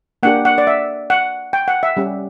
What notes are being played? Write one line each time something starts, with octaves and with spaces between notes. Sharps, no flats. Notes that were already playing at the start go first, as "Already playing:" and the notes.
A#3 D4 G4 F#5
F#5
D5
E5
F#5
G5
F#5
E5
G3 C#4 G4